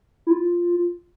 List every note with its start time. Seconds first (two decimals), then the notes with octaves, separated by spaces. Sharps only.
0.27 E4
0.31 F4